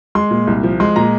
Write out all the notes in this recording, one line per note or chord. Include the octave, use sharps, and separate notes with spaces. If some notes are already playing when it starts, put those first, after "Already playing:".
G#3 C6
A#2
C2
F3
G#3 C6
A#2 A#5